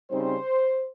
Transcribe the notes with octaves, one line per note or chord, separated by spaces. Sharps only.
C#3 G3 C4 D#4 C5